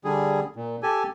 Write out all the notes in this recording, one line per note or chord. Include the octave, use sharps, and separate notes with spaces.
D3 G3 G#4
A#2
G4 A4 G#5